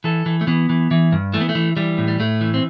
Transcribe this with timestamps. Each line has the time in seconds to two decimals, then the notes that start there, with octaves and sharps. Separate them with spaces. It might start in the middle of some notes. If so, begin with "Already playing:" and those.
0.04 E3 A4
0.26 E3
0.41 A3
0.47 E3 B3
0.69 E3
0.91 E3
1.12 G2
1.33 E3 A3
1.41 B3
1.49 A3
1.55 E3
1.77 E3 G3
1.98 A2
2.08 G3
2.20 A2 A3
2.41 E3
2.54 C4